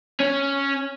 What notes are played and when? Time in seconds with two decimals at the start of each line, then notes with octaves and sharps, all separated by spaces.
0.20 C#4